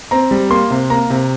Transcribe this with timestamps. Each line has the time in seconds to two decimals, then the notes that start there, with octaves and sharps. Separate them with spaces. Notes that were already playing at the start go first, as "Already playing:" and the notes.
0.11 C4 A#5
0.31 G3
0.50 A#3 C6
0.71 C3
0.90 A#3 A#5
1.10 C3